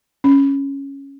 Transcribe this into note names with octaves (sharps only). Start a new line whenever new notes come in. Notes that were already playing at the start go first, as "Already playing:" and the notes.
C#4